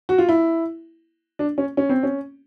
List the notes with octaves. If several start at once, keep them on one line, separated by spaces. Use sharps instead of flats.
F#4
F4
E4
D4
C#4
C#4
C4
C#4